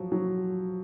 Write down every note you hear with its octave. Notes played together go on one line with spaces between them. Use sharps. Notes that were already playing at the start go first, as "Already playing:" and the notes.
Already playing: F3 F#3
F#3